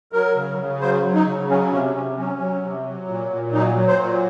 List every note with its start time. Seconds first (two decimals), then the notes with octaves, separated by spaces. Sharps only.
0.12 F#3 A#4
0.36 C#3
0.58 C#3
0.81 F#3 C5
1.03 F#3
1.14 D#4
1.27 C#3
1.48 F#3 C#4
1.72 C3 C#4
1.94 C3 C#4
2.17 F#3 C#4
2.39 F#3
2.62 C3
2.85 F#3
3.08 A#2
3.30 A#2
3.52 F#3 D#4
3.75 F#3
3.87 C5
3.99 A#2